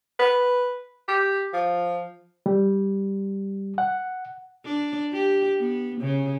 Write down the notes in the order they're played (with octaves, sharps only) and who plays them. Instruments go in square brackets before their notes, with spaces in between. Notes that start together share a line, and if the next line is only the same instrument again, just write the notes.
[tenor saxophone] B4
G4
F3
[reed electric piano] G3
F#5
[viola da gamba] D4
G4
B3
C#3